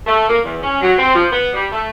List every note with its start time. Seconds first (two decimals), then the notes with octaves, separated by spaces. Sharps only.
0.07 A3
0.28 A#3
0.43 E2
0.62 C#4
0.81 F#3
0.99 C4
1.14 F3
1.32 B3
1.54 G3
1.72 A3